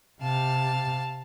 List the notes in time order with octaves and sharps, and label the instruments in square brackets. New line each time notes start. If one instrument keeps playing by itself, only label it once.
[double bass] C3 [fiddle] F5 A5